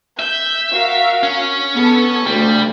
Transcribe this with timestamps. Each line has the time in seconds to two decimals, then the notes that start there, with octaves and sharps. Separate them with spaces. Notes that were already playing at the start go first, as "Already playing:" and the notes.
0.19 E5 G6
0.73 F#4 A#4 F5
1.23 C#4
1.75 B3 A4
2.26 D2 C#3 G3